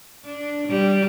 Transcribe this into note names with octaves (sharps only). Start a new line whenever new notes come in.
D4
G3